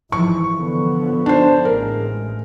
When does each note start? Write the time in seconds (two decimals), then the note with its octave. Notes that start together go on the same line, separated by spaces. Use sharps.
0.12 G#1 E3 F3 C#6
0.54 D3 F3 B3
1.26 D4 C5
1.65 A1 G#3 A#4